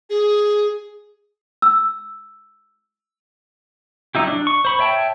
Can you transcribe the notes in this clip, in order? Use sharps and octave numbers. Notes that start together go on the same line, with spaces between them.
G#4
E6
F#3 D#4 E4 G4
D4
C#6
C5 B5 C#6
C#5 E5 G5 A5